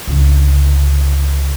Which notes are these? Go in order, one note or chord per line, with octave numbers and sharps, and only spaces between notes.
C#2 D3